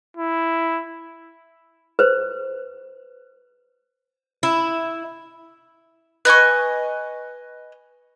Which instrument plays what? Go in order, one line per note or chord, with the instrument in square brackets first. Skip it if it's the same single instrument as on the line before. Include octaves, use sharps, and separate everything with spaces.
[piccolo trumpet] E4
[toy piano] B4 C5
[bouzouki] E4
[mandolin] B4 D#5 G#5 C#6